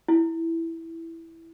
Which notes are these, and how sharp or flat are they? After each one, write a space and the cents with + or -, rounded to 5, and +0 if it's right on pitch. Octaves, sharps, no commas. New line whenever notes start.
E4 +0